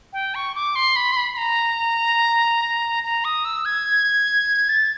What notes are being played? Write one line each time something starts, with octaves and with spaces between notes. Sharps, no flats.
G5
C#6
D6
C6
B5
C6
B5
B5
A#5
A#5
D#6
E6
G#6
A6